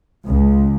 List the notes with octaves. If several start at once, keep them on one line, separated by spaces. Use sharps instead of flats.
C#2